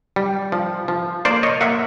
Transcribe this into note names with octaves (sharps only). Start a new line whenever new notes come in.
G3
F3
F3
A#3 C5 D5
C#5 D#5
A#3 E5 F#5